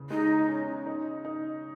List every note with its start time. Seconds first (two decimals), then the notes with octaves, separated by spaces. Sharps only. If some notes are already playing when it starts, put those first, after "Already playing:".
Already playing: E2 C#3
0.10 G#3 D#4
0.48 C#4
0.86 D#4
1.25 D#4